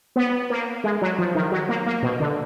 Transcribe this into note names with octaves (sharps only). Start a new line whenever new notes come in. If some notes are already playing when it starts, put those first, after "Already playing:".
B3
A#3
G#3
F#3
F3
D#3
F#3
A#3
A#3
B2
D3